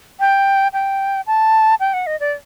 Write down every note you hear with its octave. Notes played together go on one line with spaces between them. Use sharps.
G5
G5
A5
G5
F#5
D#5
D5